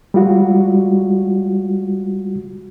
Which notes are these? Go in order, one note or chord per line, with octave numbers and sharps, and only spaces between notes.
G3 G#3 F4 F#4